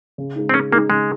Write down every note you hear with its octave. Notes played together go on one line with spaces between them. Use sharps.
C#3
G#3 D#4
C4
C#3 C#4
G#3 A#3 D#4
C#3 G#3